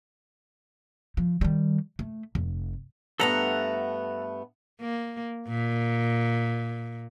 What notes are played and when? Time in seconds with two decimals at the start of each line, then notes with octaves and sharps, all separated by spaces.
1.17 F3
1.41 D#3 G3
1.99 A3
2.35 F1
3.20 G2 A3 B3 A4 F#5 A#5
4.81 A#3
5.48 A#2